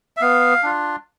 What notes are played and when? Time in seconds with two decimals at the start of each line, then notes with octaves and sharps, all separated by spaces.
0.17 E5
0.21 B3 F5
0.63 D4 F4